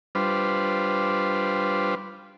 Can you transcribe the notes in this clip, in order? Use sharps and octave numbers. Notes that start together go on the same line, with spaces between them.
G3 D4 F4 B4 C5